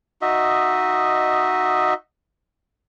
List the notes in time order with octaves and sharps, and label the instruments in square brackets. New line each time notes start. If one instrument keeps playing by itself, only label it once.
[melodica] D#4 F#4 D#5 E5